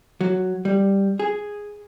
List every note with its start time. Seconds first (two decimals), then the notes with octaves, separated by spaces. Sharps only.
0.21 F#3
0.65 G3
1.20 G#4